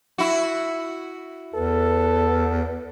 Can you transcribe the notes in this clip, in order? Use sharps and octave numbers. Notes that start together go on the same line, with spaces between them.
E4 F#4
E2 A4 B4